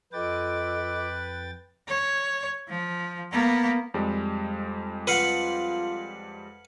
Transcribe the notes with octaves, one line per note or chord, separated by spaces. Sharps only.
F2 F4 A4 B4 D#5 G5 D6 A6
C#5
F3
A#3 B3
F2 G3 G#3
F4 B4 F5 F#5